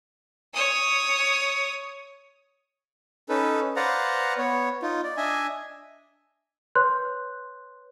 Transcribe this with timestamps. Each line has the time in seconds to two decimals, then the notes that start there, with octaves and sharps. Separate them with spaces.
0.54 C#5 D#6
3.29 C#4 D#4 A4 B4
3.76 B4 C5 D5 F5 F#5 A#5
4.38 B3 C#5
4.82 D#4 F4
5.04 D5
5.17 D4 D#5 E5 G#5
6.75 B4 C#5 C6 F#6 G6